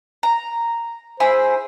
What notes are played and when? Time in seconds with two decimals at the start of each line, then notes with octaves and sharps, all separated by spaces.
0.23 A#5
1.20 E4 G#4 C5 B5